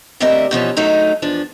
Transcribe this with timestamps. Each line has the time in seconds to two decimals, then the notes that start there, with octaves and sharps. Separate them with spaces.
0.20 D2 G3 C4 A#4 D#5 E5
0.51 B2 E3 F3 C#4
0.76 F#3 G#3 A3 D#4 A4
1.22 E2 F3 D4